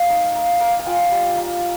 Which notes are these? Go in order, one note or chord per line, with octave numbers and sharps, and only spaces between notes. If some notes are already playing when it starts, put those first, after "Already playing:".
Already playing: F5
D#4
A#3
A#3
G#5
F4 G5
G3
A#3